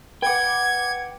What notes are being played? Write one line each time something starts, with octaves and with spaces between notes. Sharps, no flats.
B4 F#5 G5 D6 G#6